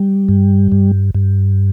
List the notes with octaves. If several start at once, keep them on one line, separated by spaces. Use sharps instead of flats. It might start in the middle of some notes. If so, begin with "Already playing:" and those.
Already playing: G3
G2
G2
G2